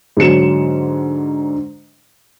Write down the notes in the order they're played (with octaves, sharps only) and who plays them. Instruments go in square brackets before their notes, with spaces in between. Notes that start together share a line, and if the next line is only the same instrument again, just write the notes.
[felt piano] G#2 D3 F#3 C#7 E7